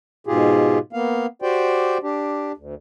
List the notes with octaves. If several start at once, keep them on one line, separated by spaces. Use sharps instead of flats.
G#2 B2 F4 G4 G#4
A#3 B3 F5
F#4 G4 C5 D5 G5
D4 G4
D2